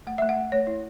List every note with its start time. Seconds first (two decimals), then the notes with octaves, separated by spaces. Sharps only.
0.07 A3 F#5
0.18 A3 E5
0.29 F#5
0.37 A3
0.52 A3 C#5
0.67 E4